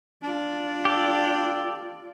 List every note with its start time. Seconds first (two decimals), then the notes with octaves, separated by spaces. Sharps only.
0.23 D4 F4 D5
0.85 G4 A4